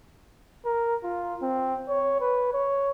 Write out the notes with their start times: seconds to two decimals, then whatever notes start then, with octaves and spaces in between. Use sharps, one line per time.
0.66 A#4
1.04 F4
1.42 C4
1.89 C#5
2.21 B4
2.54 C#5